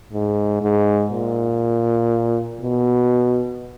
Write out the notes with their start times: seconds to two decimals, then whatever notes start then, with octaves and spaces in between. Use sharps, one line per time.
0.13 G#2
0.62 G#2
1.12 A#2
2.61 B2